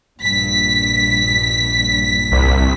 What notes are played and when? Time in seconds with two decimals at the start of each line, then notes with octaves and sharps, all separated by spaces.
0.21 A#1 G2 B6
2.32 C2